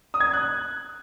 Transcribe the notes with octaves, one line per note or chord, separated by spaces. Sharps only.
D#6
G#6
D#6
F#6